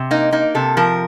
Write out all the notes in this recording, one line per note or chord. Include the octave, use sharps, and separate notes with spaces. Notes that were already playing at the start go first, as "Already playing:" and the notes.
Already playing: C3
A#3 D#4
A#3 D#4
C3 A4
F3 A#4